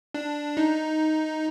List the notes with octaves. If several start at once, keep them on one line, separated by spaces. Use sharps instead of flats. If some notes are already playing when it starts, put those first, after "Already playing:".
D4
D#4